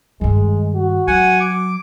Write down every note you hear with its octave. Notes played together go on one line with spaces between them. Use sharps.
G2 D#3 G#3
F#4
F#3 F#5 G#5
D6